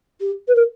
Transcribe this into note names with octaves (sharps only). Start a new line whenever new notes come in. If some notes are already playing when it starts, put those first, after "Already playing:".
G4
B4
A#4